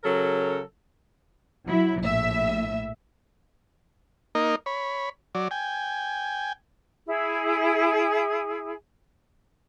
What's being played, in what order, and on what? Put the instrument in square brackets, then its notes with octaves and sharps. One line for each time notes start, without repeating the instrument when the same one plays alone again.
[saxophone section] C#3 F#3 A4 A#4
[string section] F#3 E4
A#1 A2 E5
[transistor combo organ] A#3 D#4 A#4 D#5
C#5 B5
F#3 D5
G5 G#5
[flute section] E4 G#4